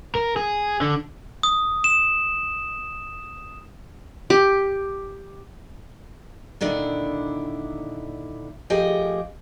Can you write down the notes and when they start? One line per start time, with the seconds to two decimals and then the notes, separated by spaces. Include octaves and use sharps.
0.15 A#4
0.36 G#4
0.81 D3
1.43 D#6
1.84 E7
4.30 G4
6.61 A#2 D3 D#3 D4 E4
8.70 F3 A3 G4 G#4 D#5